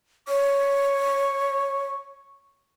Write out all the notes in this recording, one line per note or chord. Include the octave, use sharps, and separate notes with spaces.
C#5 C#6